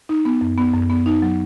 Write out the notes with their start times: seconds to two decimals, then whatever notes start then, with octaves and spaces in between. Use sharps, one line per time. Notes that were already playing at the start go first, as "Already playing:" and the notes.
0.09 D#4
0.25 B3
0.41 F#2
0.58 B3
0.74 F#2
0.90 B3
1.06 D#4
1.22 F#3